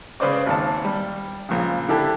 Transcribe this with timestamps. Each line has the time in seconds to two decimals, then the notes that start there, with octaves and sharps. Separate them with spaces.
0.20 C#3 B4 C5 D5 D6
0.46 G#1 D#2 A5
0.85 G3
1.49 A#1 C#3
1.89 D3 E4 G4 A5